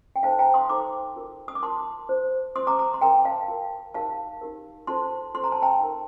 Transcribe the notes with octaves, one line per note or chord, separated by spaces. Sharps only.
G5
D#4 A4 C5 F5 A5
G5 A#5
C6 D#6
D#4 A4 C5 A#5 D6
F4 A#4
D#6
D6
F4 A#4 A5 C6
F4 C5
F4 C5 C6 D#6
A#5 D6
A#5 D6
C6
F4 A#4 G5 A#5
F5 A5
F4 A#4
D#4 G4 A#4 F5 A5
D#4 G4 A#4
F4 A4 C5 A5 C6
F4 A4 C5 C6
A#5
A5
G5 A#5
D#4 A#4